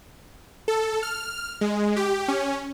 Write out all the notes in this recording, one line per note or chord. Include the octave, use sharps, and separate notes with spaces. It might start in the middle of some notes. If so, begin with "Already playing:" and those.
A4
F6
G#3
G4
C#4